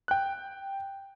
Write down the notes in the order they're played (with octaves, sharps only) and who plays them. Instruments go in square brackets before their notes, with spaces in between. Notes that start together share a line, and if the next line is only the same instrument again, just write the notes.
[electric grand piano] G5 F#6